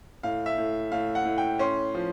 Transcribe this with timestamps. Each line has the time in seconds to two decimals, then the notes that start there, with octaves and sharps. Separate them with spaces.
0.23 A2 F5
0.46 E5
0.58 A2
0.92 A2 F5
1.15 F#5
1.25 A2
1.38 G5
1.59 C#4 C6
1.94 F3